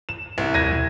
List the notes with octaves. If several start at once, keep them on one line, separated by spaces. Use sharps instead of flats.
E7
C2
D#2 G#6 A#6 D#7
B2